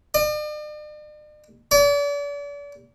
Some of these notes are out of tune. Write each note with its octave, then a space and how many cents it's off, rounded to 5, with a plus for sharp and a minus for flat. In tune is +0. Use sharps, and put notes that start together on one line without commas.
D5 +45
D5 -40